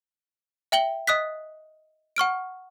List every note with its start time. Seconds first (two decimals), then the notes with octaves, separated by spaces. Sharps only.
0.72 E5 G5 F#7 G7
1.07 D#5 D#6 F#6 B6
2.16 F#5 C#6 F6 D7